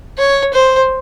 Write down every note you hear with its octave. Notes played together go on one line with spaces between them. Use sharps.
C#5
C5